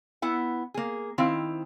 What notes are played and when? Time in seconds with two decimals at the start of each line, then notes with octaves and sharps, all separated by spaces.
0.22 B3 E4 F#5
0.74 A#3 G#4
1.18 D#3 C4 E4 F5